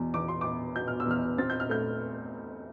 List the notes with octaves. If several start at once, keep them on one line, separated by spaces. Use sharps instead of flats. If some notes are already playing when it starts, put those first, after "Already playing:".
Already playing: E2 B2
E2 D6
C6
B3 D6
B2 G6
F6
E6
E2 F6
C4 A6
G6
F6
A3 G6